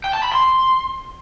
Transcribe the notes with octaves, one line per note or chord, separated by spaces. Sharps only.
G5
A5
B5
C6